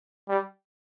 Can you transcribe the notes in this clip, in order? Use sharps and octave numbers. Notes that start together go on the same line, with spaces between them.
G3